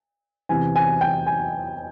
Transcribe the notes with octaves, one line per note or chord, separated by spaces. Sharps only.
E2 C3 E3 G#5
G#5
G5
G#5